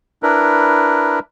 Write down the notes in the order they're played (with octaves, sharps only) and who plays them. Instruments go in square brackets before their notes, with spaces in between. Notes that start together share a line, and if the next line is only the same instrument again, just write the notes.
[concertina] D4 E4 A#4 B4